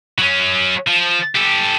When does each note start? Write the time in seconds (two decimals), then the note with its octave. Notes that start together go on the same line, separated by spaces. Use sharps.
0.19 F#3 C#4
0.88 F3
1.36 G4 A4